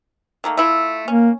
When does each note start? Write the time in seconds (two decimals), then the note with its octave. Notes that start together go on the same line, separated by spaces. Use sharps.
0.44 D#3 A3 A#3
0.57 A3 E4 F4
1.08 A#3 C#4